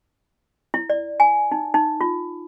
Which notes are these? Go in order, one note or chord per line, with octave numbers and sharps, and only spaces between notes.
E4
D5
G#5
D#4
D#4
F4